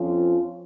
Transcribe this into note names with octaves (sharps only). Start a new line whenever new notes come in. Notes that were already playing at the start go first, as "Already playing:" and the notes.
Already playing: F2 F3 C#4 F4